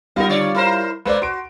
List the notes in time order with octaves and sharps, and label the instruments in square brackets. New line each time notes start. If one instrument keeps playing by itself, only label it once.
[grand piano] G3 F4 F5 [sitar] B3 D#4 A#4
[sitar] D3 C#5 D5
E4 A#4 C5
[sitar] G#3 A#3 [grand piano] B4 C5 D5
[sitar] F#4 [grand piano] C6 D7